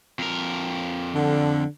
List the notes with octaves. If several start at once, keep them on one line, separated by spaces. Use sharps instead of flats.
F2 A#4
D3